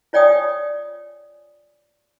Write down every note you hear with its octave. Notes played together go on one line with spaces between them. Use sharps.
F4 C#5 D5 G5 G#5 D#6